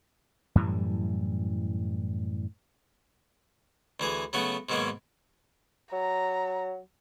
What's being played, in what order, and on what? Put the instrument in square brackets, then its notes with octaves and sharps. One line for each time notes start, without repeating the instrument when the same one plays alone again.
[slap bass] F#2 A2 E3 G3
[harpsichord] D2 E3 G#4
C#3 F#3 A3 B3 F#4
G#2 B2 D#3 F#3 G#3 A#3
[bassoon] F#3 [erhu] A#5